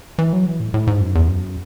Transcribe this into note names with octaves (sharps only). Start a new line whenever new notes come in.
E3
F#3
E3
A2
A2
G#2
F#2
E2
F#2